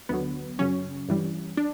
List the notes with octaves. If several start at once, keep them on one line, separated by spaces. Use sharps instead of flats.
D2 D3 F#3 B3
F#2 C#3 F#3 C#4
G2 E3 G3
D4